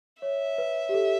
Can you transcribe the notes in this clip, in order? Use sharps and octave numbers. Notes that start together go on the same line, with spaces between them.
C#5 E5
B4
G4
A4